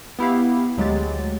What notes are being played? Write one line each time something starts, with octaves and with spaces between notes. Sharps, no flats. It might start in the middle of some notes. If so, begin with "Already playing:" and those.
B3 E4 G4 F5
D2 F#3 G#3 G4 A6